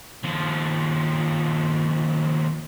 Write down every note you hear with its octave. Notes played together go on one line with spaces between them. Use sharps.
D#2 F3